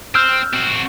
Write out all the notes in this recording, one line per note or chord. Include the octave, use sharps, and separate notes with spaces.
C4 E6 F6 G6
C4 F#4